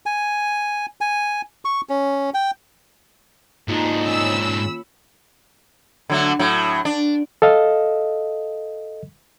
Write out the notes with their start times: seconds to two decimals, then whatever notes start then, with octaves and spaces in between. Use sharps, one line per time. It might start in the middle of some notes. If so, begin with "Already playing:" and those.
0.06 G#5
1.01 G#5
1.65 C#6
1.89 C#4
2.34 G5
3.68 D2 G#2 A#3 C4 D4 D#4 F4 C#7
4.04 C#4 B5 E6
6.10 D3 F#3 A3
6.39 A2 F#3
6.85 D4
7.42 A4 D#5 F5